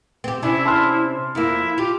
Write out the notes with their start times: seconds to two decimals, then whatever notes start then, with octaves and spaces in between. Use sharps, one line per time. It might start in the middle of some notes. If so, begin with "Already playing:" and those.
0.24 C4 G4
0.43 C3 C#4 D4 E4
0.65 A5 C6 F6
1.35 F2 A#3 E4
1.78 F4 G4